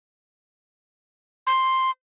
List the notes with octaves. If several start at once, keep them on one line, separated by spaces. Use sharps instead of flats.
C6